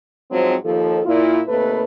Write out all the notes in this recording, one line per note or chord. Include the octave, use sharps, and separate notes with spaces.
G#2 F3 F#3 C4
D#2 F3 A4
A#2 E4 F4
D#2 C3 A3 A#3 B4